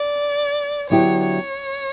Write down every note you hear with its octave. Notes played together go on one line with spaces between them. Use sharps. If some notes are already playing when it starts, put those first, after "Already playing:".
Already playing: D5
D3 F#3 B3 E4 G4 C#5
C#5